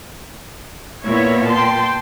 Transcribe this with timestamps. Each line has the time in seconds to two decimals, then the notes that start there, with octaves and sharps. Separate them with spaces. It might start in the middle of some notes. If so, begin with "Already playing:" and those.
1.05 A#2 B3 E4 C#5
1.50 G5 A5 C6